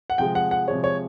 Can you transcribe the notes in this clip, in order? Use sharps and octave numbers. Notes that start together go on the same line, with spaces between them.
F#5
C3 F3 G#3 G5
F#5
F#5
C3 F3 G#3 C#5
C#5